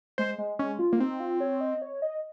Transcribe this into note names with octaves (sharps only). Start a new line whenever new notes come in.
G#3 C5
G#3
G#3 C#4
F4
A#3
C4 D#4
F4
C#5
D#5
C#5
D#5